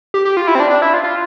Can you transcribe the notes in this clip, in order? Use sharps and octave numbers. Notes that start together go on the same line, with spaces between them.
G4
G4
F4
E4
C4
D4
D4
E4
F4
F4